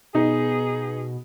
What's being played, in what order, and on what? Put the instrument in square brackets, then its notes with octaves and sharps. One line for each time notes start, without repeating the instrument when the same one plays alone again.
[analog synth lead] B2 [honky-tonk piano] D#4 [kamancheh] G#4